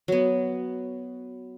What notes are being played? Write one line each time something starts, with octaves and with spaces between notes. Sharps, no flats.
F#3 B3